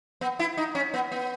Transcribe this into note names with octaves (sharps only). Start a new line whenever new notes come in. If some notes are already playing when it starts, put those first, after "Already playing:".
B3
E4
D#4
C#4
B3
B3